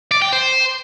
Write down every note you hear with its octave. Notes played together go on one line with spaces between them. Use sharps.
D5
G5
C5